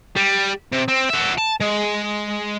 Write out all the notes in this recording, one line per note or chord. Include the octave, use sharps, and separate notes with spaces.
G3
C3
C4
F#4 E5
A5
G#3